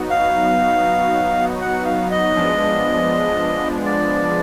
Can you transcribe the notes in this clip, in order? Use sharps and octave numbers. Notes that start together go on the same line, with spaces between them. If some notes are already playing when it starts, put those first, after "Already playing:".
Already playing: F#3 B3 D#4 F#4
F5
F#5
F5
D#5
F3 G#3 B3 D4
D5